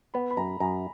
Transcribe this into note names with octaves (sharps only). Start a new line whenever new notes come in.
B3 B5
B5
F#2 A#5
F#2 A#5